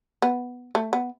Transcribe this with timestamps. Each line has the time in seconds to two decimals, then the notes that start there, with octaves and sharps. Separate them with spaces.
0.22 B3
0.75 A3
0.93 B3